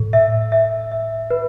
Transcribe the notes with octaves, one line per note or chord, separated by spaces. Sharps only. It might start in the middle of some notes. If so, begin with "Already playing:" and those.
Already playing: A2
E5
E5
E5
B4